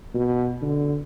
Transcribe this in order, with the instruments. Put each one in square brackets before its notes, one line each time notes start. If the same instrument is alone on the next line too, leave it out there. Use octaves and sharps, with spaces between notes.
[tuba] B2
D3